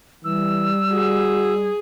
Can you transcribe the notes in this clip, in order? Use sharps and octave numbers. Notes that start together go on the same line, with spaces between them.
E3 G3 E6
F#4 G#4